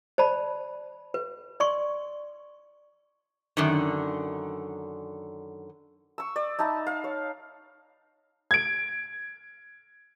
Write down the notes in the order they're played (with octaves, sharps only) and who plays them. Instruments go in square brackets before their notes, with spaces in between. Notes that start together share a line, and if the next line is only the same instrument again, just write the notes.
[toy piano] C5 D5 A5 B5
B4
D5 C6 C#6
[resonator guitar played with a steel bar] F#2 D3 D#3
[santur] C#6 E6
D5
D#4 E5 A5 B5
F5
C#5
[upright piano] G#6 D7